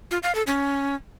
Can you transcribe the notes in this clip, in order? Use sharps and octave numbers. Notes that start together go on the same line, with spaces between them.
F4
F5
A4
C#4